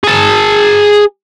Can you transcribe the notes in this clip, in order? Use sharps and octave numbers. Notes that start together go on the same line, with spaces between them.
G#4 A5